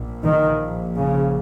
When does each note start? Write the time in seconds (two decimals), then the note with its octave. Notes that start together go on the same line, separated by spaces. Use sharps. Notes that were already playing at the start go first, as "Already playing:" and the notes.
Already playing: A#1 A#2
0.23 D#3
0.95 C#3